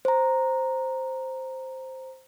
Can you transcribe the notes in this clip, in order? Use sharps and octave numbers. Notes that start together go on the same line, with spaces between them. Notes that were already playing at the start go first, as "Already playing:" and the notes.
C5 A#5